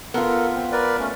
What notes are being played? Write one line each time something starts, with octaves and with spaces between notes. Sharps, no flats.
B3 F4 A4 A#4
C4
A#4 B4 D5
A3 C#4